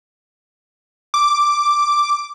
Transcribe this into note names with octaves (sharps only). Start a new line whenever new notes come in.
D6